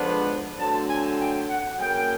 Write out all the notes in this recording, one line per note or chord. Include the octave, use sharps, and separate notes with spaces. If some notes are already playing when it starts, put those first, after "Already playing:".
Already playing: D3 F3 G#3 B3 D4
D3 F#3 A3 C4 A5
G#5
G5
F#5
C#3 F#3 A#3 G5